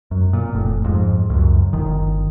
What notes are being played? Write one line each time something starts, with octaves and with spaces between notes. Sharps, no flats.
F#2
A#2
F1 A2
F2 G#2
C#2 F#2
G1 D#3